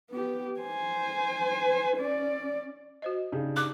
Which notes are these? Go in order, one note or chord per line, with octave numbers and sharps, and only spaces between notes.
B3 G4
C5 G#5
C#4 D5
F#4 C5 D#5
C#3 D4 D#4 G4
D6 F#6